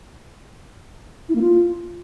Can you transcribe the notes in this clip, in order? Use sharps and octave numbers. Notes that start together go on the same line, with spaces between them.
E4
A#3
F4